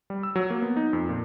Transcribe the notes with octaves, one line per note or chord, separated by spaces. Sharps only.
G3
E6
F#3
A#3
B3
D#4
F2
A#2